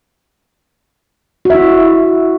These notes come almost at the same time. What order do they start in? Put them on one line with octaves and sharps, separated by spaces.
F#4 E5 E4